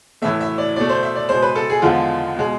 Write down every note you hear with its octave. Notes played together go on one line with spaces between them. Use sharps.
A2 E3 A3 E5
E5
D5
B2 A3 D5
C5
E5
D5
B2 G#3 C5
B4
A4
G#4
E2 D3 F3 G#3 F4
B2 G#3